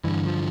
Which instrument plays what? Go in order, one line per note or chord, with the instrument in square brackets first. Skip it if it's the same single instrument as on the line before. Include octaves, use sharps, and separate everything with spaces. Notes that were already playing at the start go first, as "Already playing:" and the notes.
[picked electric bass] G2 D3 E3
F3